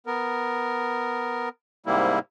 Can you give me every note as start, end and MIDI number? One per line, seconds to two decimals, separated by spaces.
0.07 1.49 59
0.07 1.49 70
1.86 2.19 44
1.86 2.19 48
1.86 2.19 55
1.86 2.19 58
1.86 2.19 64